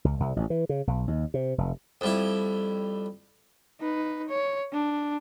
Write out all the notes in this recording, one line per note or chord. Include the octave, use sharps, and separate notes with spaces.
C#2
C2
A1
E3
C#3
B1
D#2
C3
F1
F2 G3 E4
D#4 B4
C#5
D4